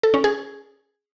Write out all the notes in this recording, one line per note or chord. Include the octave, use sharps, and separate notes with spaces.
A4
C#4
G#4